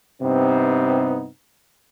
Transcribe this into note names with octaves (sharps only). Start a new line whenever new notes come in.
G2 C3 B3 C4 D#4